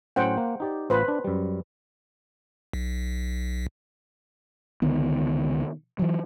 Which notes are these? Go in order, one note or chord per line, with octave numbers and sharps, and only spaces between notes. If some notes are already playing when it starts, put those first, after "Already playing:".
A2 F#3 C#4 C5 F#5 G5
A#3
D#4 G4 D5
A1 F4 B4 C5
D4
F#2 G3
B1
C#2 D3 D#3 B3
E3 F#3